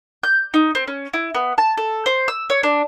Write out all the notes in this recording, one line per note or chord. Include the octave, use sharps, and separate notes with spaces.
G6
D#4
C4
C#4
E4
B3
A5
A4
C5
E6
C#5
D4